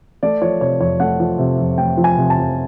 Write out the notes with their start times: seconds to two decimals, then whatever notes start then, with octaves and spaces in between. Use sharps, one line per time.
0.23 A3 D5
0.41 F3 C#5
0.61 C3 C#5
0.80 F2 C#5
1.00 A3 F#5
1.20 F3
1.39 C3
1.59 F2
1.78 A3 G5
1.97 F3
2.04 G#5
2.18 C3
2.30 A5
2.37 F2